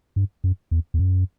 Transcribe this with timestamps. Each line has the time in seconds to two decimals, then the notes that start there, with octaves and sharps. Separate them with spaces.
0.16 G2
0.44 F#2
0.71 E2
0.94 E2
0.99 F#2